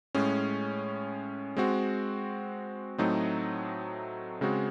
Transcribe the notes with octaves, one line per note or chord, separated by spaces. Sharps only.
A2 G#3 C#4
G#3 C4 F#4
A2 F#3 A3 C4 D#4
C#3 G#3 C4 F#4